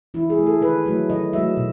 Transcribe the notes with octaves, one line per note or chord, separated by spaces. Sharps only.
E3 E4
G#4
A3
A4
D#3 B4
F#3 A3
D#3 D#5
F#3 A3 E5
B2